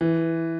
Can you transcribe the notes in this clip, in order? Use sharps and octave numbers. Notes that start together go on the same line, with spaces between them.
E3